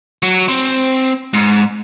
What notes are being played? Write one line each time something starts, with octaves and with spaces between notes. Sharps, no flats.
F#3
C4
G#2